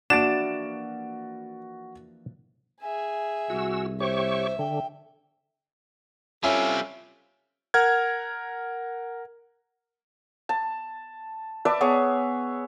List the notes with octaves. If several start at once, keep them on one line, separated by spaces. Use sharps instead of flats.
E3 F3 A#3 D4 F#4 A6 D7 E7
G#4 E5 G#5
C2 F#4 E6
G4 C5 C#5 E5 C#6
D3 G5
G3 C4 C#4 F4 A4 C#5 E5 G#5
A#4 F#5 F6 G#6
A5
B4 D5 E5 A5
B3 G#4 C#5